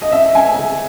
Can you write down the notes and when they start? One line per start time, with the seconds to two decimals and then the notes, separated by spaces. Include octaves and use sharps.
0.02 D#5
0.11 C#4 E5
0.35 C#4 G#5
0.58 C#3